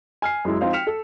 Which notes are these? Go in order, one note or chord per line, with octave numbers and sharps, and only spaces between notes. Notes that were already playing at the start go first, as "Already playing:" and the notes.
G#5 F6 C7
F#2 G#3 E4
F3 C4 D#4 C5 F5
G5 F6 B6 C#7 E7 F7
A4